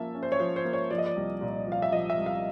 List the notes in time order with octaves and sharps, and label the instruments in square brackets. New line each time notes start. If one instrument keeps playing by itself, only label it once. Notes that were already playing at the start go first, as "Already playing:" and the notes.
Already playing: [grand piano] F3 A#3 C#4 E5 A5
C#4
C5
C#5
F3 C5
C5
A#3
C#5
F3 D5
D#5
D5
C2
A#2
F3
F5
E5
F3 D#5
E5
C2
F5